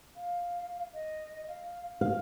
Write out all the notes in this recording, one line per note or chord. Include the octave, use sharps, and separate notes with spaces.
F5
D#5
F5
F#4 F5